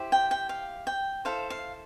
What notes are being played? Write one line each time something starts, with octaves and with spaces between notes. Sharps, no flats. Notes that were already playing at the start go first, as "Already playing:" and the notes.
Already playing: E4 G4 C5
G5
G5
F5
G5
E4 A4 C5 F5
F5